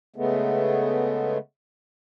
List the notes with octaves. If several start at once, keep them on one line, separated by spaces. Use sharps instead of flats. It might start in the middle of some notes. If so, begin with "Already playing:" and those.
C#3 G#3 A3 B3